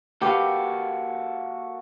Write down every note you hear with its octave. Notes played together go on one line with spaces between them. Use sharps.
A#3 F#4 G4 A4 B4 F5